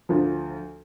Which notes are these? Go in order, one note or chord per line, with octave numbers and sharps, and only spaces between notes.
D2 F3